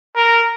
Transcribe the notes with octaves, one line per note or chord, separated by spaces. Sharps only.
A#4